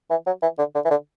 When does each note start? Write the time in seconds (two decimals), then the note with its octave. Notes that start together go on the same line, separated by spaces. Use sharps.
0.10 E3
0.26 F#3
0.42 E3
0.58 D3
0.75 D3
0.85 E3
0.90 D3